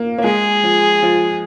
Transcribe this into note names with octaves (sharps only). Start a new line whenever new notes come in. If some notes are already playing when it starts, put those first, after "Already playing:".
Already playing: A#3
A#3
G#3 G#4
F3
F3